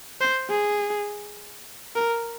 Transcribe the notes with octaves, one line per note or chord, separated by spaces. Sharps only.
C5
G#4
A#4